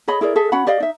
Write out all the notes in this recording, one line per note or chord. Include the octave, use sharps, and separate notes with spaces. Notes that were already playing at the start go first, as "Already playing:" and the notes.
G#4 C#5 D#5 B5
E4 G#4 A#4 D5
G#4 A4 E5
C#4 F#4 F#5 B5
G4 D5 D#5 F5
D#4 E5